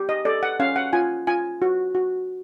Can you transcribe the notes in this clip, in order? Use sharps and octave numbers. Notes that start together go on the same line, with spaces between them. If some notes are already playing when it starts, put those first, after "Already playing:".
Already playing: G4
D#5
A4 D5
F#5
C#4 F5
F#5
F4 G#5
F4 G#5
F#4
F#4